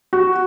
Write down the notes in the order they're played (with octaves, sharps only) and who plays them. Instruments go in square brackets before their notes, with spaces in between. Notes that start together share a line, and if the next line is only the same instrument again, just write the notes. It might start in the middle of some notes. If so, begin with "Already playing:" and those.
[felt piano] F#4